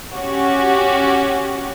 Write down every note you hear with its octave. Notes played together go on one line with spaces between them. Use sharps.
C#4 F#4 G4